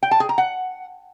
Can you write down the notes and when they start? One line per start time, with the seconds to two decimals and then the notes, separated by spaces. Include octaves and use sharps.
0.03 G5
0.11 A5
0.20 G#4
0.29 A#5
0.38 F#5